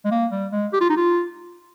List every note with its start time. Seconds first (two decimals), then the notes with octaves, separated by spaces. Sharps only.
0.05 G#3
0.11 A#3
0.31 G3
0.52 G#3
0.73 G4
0.81 F4
0.90 D#4
0.97 F4